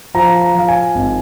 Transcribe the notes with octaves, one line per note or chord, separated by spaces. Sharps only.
F3 A#5
A#5
F3 F5
G#5
G#1